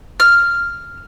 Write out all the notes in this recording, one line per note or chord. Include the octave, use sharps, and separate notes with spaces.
F6